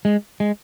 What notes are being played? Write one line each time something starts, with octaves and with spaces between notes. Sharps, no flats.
G#3
G#3